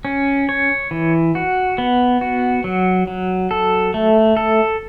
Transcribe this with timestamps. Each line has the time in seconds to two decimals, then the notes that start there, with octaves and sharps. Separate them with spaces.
0.05 C#4
0.49 C#5
0.91 E3
1.35 F#4
1.78 B3
2.21 F#4
2.64 F#3
3.07 F#3
3.51 A4
3.94 A3
4.37 A4